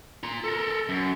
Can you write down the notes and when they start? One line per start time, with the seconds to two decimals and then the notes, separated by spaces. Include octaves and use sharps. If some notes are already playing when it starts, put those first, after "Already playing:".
0.23 F4 A#5
0.44 A4 A#4
0.89 F#2